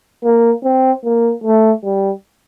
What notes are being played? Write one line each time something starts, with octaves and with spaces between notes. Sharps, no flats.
A#3
C4
A#3
A3
G3